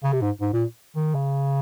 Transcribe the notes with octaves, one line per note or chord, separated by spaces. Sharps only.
C#3
C3
G#2
G#2
A#2
D#3
C#3